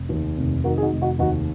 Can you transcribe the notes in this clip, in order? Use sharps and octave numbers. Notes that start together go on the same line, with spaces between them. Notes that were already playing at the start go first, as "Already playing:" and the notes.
Already playing: F1
D#2
F1
D#3 F#4 A#4
G#4
D#4 F#4
F1
D#4 F#4
D#2 D#4 F#4